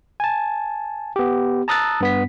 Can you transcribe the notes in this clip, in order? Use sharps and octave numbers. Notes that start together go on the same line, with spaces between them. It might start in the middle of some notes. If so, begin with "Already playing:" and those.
G#5 A5
B3 G4
A5 A#5 D#6 E6 F#6 A6
G2 B3 B6